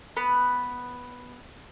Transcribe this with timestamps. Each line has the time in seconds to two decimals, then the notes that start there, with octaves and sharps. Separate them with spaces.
0.17 B3 B5